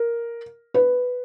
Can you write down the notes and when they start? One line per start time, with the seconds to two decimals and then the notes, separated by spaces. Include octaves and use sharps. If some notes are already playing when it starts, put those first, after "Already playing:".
Already playing: A#4
0.74 B4